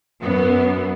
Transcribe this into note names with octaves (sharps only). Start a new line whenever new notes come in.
F#2 B3